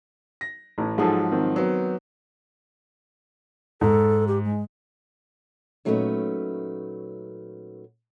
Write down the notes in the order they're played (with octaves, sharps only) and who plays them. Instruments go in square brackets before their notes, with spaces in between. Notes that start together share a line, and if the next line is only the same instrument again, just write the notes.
[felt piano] A#6
[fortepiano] A1 A2
[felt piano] G#2 F3 F#3 [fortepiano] G#4 A4
[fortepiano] D#3 C4
[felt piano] F#3 B3
[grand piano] G#2 [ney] A4
[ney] G4
G#3
[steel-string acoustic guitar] A#2 F#3 A3 C#4 D#4 B4